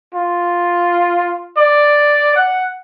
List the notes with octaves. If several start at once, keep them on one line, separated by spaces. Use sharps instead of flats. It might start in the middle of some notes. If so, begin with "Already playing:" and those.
F4
D5
F#5